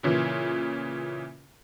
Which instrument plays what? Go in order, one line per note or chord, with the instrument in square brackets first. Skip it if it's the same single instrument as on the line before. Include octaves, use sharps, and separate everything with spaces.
[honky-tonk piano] A#2 C#3 E3